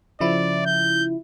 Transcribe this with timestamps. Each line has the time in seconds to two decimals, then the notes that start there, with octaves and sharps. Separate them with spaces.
0.21 C#3 F3 E4 D5
0.66 G6